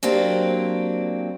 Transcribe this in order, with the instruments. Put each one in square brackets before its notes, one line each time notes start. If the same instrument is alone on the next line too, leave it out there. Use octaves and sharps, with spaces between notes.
[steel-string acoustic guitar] F#3 A#3 C4 D4 G4